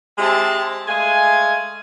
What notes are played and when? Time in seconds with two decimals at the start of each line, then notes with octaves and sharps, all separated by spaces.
0.18 G#3 C4 E4 G4 A5
0.87 G#3 A3 F5 G#5